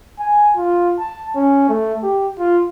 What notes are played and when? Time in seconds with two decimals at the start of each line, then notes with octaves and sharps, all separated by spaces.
0.19 G#5
0.57 F4
0.99 A5
1.36 C#4
1.69 A3
2.03 G4
2.39 F4